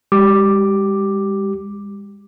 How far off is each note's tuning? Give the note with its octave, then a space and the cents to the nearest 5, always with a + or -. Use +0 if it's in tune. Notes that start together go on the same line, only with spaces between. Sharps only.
G#3 -45 G4 -20 D6 +5